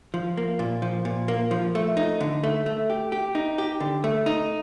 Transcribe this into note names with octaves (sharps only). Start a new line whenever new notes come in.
F3
A#3
A#2
F3
A#2
A#3
F3
A3
D#4
D3
A3
A3
G4
G4
D#4
G4
D3
A3
D#4